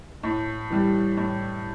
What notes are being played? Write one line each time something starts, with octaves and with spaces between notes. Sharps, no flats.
A2
E3 G3
A2